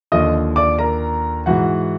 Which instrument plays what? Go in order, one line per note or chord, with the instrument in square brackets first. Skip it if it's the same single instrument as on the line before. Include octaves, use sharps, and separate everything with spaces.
[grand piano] D#2 D3 F3 D#5 D#6
D5 D6
A#4 A#5
G#2 E3 F#4 F#5